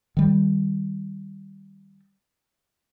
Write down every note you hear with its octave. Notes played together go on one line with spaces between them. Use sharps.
D#3 G3